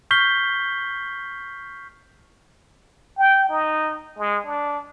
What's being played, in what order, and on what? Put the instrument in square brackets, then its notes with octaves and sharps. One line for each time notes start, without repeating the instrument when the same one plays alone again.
[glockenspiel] C#6 F6 G6 B6 C7 G7
[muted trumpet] G5
D#4
G#3
D4